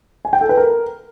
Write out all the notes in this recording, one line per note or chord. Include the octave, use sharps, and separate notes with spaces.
G#5
G5
A4
B4
A#4